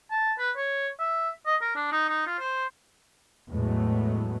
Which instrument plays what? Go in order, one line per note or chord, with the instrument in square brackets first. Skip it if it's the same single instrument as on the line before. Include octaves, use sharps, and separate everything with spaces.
[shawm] A5
B4
C#5
E5
D#5
A#4
D4
D#4
D#4
F4
C5
[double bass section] E2 A2 F#3 G#3 A3 B3